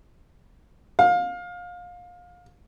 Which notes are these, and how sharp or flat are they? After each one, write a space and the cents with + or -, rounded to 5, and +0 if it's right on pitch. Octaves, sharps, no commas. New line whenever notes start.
F5 +25